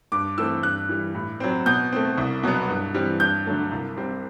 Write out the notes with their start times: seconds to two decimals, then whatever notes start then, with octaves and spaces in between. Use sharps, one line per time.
0.12 G2 D6
0.37 E3 A3 C4 E6
0.63 G2 F#6
0.89 E3 G3
1.15 A2
1.40 F#3 C4
1.66 B2 G6
1.92 A3 C4
2.18 C2
2.43 B2 F#3 B3
2.68 G2
2.94 E3 G3 C4
3.20 G2 G6
3.46 D3 F#3 A3
3.71 C2
3.97 C3 G3 C4